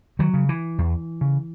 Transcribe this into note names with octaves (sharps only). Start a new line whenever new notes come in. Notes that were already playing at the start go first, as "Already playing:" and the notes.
D#3 F#3
C#3
E3
E2
C#3